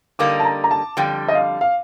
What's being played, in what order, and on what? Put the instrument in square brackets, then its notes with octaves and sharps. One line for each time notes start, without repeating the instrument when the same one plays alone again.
[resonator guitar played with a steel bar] D3 G3 A#3 D#4 [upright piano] D6
[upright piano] A5
A#5
A#5
A5
[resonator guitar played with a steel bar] F2 D3 G3 [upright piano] G5
[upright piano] D#5
F5
F5